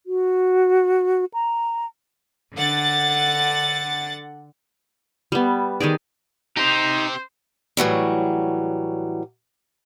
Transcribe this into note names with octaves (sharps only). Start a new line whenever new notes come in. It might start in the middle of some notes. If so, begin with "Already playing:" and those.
F#4
A#5
D3 F#5 A6
G3 B3
D#3 G4 G#4 D5
C4 D#4 G4 C5
A2 E3 F#3 G3